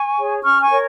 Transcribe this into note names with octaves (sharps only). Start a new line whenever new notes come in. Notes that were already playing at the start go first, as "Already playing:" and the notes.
Already playing: G#5 C#6
G#4 C#5
C#4 C#6 F6
G#5 C#6
A#4 C#5